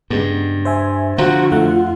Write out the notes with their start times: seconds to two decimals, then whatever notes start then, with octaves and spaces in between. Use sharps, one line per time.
0.10 G2 C#3 G#3 B3
0.65 C5 E5 G#5
1.18 D3 F3 F4 F#4 C5 A#5
1.51 F2 A3 F4 F#5